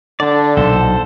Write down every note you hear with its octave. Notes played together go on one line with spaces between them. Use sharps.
D3 D4 D5
B1 A#2 A4 C5